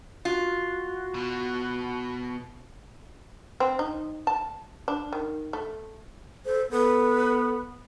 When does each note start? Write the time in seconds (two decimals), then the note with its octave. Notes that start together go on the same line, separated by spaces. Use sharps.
0.25 F4 F#4
1.14 B2
3.60 C4
3.79 D#4
4.27 A5
4.88 D4
5.13 D#3
5.53 A3
6.45 A4 C5
6.71 B3 A4 B4